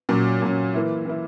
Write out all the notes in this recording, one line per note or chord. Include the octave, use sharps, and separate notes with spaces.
A#2 F#3 C#4
A#2 F#3 C#4
E3 A#3 E4
E3 A#3 E4